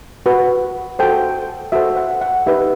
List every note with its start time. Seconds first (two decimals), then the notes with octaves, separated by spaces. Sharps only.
0.26 F#4 B4
0.99 F#4 A4 C5 G5
1.72 F#4 A4 C5 E5
1.97 F#5
2.21 F#5
2.46 D#4 G4 B4 E5